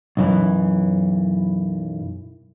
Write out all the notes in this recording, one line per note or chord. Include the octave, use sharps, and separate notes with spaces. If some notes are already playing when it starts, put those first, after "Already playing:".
B1 F#2 E3